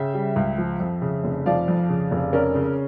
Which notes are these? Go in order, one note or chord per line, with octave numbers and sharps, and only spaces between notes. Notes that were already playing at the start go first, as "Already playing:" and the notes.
Already playing: C#3 E5 G5
G3
C#2
F3
F2
C#3
F1
F3 D5 F5
F2
C#3
F1
C#4 A#4 D5
C#3